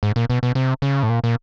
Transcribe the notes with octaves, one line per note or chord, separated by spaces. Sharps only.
G#2
A#2
B2
B2
C3
C#3
A2
A#2
A#2